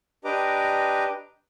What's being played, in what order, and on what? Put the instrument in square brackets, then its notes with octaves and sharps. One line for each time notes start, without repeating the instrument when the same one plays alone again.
[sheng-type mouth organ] D4 G4 B4 D#5 A#5 D6